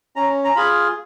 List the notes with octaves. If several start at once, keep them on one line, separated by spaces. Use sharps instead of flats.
C#4 A#5
A#5
F4 G#4 B5